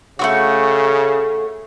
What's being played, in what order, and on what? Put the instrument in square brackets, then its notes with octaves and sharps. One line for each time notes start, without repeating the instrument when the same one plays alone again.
[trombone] C#3 [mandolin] A3 C4 F#4